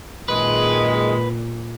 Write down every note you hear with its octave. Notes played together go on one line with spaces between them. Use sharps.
F#2 A#2 D#3 G#3 B4